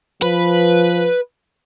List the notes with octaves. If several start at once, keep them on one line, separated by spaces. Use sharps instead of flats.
F3 B4